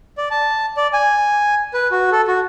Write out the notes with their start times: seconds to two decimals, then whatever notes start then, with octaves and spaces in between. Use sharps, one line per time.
0.18 D5
0.31 A5
0.77 D5
0.93 G#5
1.74 B4
1.91 F#4
2.12 A4
2.28 F#4